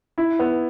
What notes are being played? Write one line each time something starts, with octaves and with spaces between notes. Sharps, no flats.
E4
B3